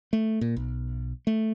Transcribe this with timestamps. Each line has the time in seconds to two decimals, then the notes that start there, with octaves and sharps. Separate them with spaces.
0.13 A3
0.41 A#2
0.57 B1
1.27 A3